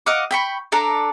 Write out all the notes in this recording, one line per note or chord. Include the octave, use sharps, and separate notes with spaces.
D#5 F5 F#5 D6
G5 B5 C#6
D4 A4 D5 A#5